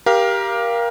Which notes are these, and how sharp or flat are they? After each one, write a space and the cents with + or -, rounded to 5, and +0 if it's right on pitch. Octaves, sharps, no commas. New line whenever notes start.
G4 +0 A#4 +20 F5 -15